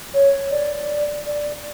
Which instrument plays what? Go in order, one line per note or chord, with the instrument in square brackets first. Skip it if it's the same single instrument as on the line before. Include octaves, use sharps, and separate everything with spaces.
[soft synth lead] C#5
D5
D5